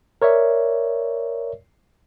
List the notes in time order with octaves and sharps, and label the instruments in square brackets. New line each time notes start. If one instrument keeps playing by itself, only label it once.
[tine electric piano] A#4 C#5 D5 E5